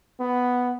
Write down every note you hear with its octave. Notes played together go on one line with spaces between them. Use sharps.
B3